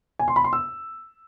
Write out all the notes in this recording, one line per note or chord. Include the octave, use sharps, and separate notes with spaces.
G#5
C6
B5
C6
E6